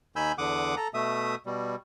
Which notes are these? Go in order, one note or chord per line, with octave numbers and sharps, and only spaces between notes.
D#2 D#3 G#5 B5 E6 G6
E2 D3 F#5 D6 D#6
A4 A#5
B2 A3 E5 D#6
B2 G3